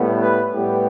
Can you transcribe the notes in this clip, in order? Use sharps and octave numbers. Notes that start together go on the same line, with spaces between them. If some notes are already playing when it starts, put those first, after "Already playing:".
Already playing: A2 G3 B3
B4
A2 G3 B3 G4